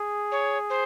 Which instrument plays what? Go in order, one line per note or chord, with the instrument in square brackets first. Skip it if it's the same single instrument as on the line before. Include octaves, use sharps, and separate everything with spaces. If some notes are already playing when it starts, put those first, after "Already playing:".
Already playing: [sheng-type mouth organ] G#4
[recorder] C#5
C5